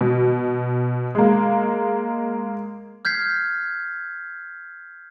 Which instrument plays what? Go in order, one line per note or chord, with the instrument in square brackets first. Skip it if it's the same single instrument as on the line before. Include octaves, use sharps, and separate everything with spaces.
[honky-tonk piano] B2
G#3 A#3
[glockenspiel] F6 G6 G#6 B6 C7